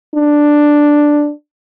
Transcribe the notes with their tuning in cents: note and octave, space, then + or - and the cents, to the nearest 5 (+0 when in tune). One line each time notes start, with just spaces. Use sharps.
D4 +5